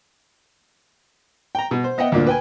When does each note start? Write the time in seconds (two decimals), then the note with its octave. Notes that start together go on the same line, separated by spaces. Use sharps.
1.55 G5 A#5
1.71 B2
1.84 C5
1.98 B3 D#5 E5 F#5 G5
2.12 D2 A#2 A#3 D4
2.27 B4 G5 G#5